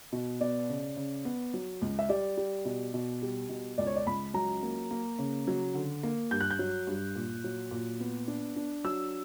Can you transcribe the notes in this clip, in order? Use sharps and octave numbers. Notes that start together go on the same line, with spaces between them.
B2
B3 D5
C#3
C#3
B3
F#3
C#2
E5
G3 D5
G3
B2
B2
G3
B2
C#2 D5
C#5
D5
C#2 B5
F#3 A#5
A#3
A#3
C#3
F#3
D3
A#3
G2 G6
F#6
G6
F#3
G2
A#2
F#3
A#2
B3
D4
D4
F#3 E6